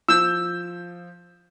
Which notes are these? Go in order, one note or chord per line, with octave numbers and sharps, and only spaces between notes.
F3 E6 G6